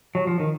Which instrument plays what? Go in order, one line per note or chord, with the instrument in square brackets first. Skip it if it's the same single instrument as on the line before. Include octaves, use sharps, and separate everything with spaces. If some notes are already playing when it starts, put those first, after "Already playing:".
[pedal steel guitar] F#3
F3
D#3